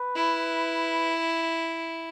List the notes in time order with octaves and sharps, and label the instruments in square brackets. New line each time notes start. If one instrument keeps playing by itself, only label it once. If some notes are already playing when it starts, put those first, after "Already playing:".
Already playing: [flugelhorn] B4
[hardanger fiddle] E4